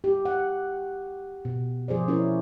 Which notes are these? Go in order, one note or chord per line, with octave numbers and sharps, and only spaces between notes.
G4
F#5
B2
F3 G#4 C5 D5
C#4 E4 A#4 C#5